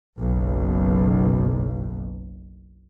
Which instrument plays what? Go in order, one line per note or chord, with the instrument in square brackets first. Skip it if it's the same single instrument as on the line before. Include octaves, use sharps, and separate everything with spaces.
[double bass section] F#1 B1